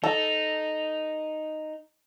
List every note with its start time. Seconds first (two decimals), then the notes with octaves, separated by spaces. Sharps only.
0.04 D#4 A4